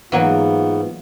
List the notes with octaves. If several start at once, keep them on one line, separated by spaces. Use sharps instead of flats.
G#2 E3 F#3 A#3 B3 F4